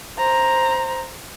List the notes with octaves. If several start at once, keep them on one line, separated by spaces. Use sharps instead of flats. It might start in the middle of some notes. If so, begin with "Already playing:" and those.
C5 A#5